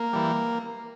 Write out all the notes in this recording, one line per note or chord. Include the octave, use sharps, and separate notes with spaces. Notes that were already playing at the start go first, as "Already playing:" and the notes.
Already playing: A#3
E3 G3